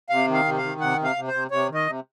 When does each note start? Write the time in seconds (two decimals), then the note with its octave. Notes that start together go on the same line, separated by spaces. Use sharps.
0.10 C3 F5
0.27 D#3
0.34 F5
0.45 C3
0.58 F5
0.63 D#3
0.80 C3 F#5
0.98 C3
1.04 F5
1.16 C3
1.27 C5
1.34 C3
1.51 C3 C#5
1.69 D#3
1.74 D#5
1.87 C3